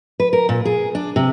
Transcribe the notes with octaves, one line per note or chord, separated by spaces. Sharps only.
B4
A#4
A#2
G#4
D4
C3